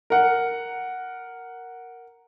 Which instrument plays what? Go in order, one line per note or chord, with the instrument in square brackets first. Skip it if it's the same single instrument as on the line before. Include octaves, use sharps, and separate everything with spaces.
[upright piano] A#4 F#5